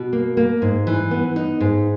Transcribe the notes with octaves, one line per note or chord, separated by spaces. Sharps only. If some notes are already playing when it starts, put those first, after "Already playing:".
Already playing: B2
A#3
A#3
G#2
E3
B3
D#4
G#2